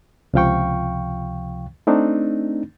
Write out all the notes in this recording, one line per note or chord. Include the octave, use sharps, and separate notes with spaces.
C#2 C3 F3 F5 G5 C#6
A3 C4 D4 D#4